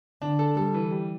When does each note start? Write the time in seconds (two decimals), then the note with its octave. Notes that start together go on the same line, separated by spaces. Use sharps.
0.22 D3 D4
0.39 A4
0.56 G3 A4
0.74 E3
0.91 G3